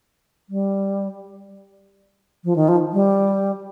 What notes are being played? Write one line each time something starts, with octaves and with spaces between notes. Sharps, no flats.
G3
F3
D#3
F3
G3